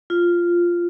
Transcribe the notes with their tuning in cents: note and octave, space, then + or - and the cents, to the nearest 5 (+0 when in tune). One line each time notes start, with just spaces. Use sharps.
F4 -5